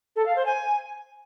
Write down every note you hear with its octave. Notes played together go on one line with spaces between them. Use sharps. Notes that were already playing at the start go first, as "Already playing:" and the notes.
A4
F5
C5
G#5